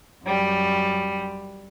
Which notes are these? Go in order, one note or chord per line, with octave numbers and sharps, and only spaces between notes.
F#2 G3